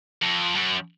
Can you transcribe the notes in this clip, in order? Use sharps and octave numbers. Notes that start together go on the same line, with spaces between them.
F2
F#2